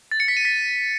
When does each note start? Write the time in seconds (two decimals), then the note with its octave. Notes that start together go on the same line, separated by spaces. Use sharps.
0.11 A6
0.20 C#7
0.28 B6
0.37 D#7
0.45 B6